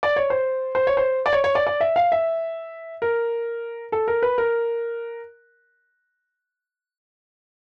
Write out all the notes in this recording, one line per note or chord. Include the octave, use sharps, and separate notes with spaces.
D5
C#5
C5
C5
C#5
C5
D5
C#5
C#5
D5
D5
E5
F5
E5
A#4
A4
A#4
B4
A#4